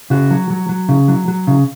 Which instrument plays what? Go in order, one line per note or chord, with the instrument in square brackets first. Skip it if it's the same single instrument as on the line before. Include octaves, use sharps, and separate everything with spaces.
[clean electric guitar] C#3 F#4
F#3
F#3
F#3
C#3
F#3
F#3
C#3